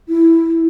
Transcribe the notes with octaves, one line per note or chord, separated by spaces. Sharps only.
E4